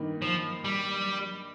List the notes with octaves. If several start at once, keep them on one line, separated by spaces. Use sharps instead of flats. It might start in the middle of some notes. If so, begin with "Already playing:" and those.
Already playing: G2 D#3 A#3 D#4
F3
G3